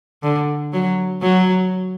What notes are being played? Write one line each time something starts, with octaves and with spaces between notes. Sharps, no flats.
D3
F#3
F#3